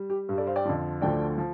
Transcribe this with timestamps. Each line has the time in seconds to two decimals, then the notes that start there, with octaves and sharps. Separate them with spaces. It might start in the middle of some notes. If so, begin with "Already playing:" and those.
Already playing: G3
0.10 G4
0.29 G2 G3
0.38 A4 D5
0.47 C5 F5
0.56 D5 G5
0.66 F2 D3 F3
1.02 D2 D3 F3 A3 D5 G5
1.38 F3